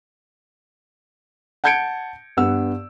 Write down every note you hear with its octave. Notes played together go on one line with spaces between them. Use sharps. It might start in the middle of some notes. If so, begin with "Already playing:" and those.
F#5 A5 G6 G#6 C#7 D7
G2 B3 F#5 E6